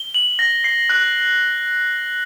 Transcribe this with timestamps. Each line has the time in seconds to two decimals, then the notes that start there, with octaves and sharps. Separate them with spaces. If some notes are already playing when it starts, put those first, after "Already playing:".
Already playing: G7
0.14 F#7
0.39 A#6
0.64 C7
0.89 F#6